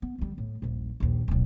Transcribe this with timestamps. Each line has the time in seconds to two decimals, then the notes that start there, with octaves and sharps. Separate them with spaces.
0.02 B3
0.18 D2 G3
0.38 A2
0.62 D#1 A#1
1.00 A#1 D#2
1.28 D1 B1